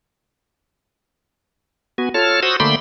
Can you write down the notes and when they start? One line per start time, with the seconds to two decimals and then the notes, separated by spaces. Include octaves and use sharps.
1.98 B3 F#4 G#5
2.14 F4 A4 C#5 A5 F6
2.43 F#4 C5 F#5 D#6 E6
2.60 D3 A3 A#3 G5 B5 C6